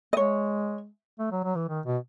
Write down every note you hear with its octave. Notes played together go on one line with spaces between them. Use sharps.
D#5
G#3 C#5
A3
F#3
F#3
E3
D#3
B2